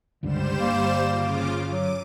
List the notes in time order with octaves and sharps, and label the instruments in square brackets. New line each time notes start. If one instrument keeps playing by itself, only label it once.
[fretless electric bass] C#2 G2 D3 [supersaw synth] G3 C5 E7
[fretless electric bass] G1 [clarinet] A#3
[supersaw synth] C#3 F4 D6
[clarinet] F#3 [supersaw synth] D6 D#7